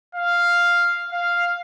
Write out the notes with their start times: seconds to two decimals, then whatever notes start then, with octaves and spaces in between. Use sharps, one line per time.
0.15 F5
1.12 F5